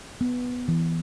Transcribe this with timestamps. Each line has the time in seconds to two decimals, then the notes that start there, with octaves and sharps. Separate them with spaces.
0.21 B3
0.68 E3